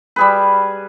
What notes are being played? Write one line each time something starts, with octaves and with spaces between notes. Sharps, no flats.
G3 G#4 B4